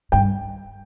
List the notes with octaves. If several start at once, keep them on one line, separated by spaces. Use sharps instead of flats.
G2 G5